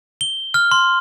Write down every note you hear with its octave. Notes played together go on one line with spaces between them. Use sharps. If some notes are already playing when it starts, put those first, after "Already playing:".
G7
F6
C6